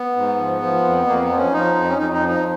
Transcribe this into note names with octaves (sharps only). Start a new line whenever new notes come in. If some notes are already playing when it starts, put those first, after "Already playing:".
Already playing: B3
G#2
F3
F3
F2
F2 A#3
B3
F3
C#4
F3 D#4
F2
C#4
F2 D#4
D#4
F3
D#4